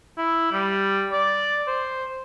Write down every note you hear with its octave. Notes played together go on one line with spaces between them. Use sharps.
E4
G3
D5
C5